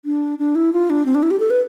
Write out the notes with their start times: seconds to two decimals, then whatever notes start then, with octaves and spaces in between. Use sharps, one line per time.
0.05 D4
0.39 D4
0.55 E4
0.73 F4
0.90 D4
1.06 C4
1.15 D4
1.23 E4
1.31 G4
1.40 A4
1.50 B4